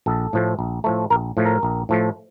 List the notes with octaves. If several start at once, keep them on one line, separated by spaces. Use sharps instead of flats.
A#1 A4
A2 F3 A3
A#1
A2 F3 A3
A#1 A#4
A2 F3 A3
A#4
A#1
A2 F3 A3